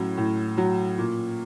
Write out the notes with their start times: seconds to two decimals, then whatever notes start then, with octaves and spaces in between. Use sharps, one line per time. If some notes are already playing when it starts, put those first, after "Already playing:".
Already playing: A2 F#3 C#4
0.17 A2
0.57 F#3
0.98 A#2